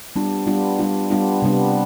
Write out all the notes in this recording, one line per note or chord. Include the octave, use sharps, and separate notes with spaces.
G3 B3 D4 F4
G3 B3 D4 F4
G3 B3 D4 F4
G3 B3 D4 F4
C3 G3 B3 D4